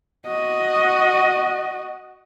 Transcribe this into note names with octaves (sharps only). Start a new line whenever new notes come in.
F#4 D#5